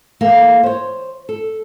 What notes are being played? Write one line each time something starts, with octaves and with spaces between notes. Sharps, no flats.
E3 A#3 A4
C5 C#5
A4